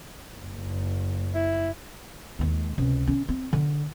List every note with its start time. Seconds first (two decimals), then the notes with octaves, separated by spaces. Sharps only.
0.36 F#1
1.35 E4
2.39 D#2 G#3
2.78 C#2 C3
3.07 D3 C#4
3.29 C4
3.53 D3